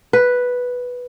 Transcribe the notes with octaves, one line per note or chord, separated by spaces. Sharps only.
B4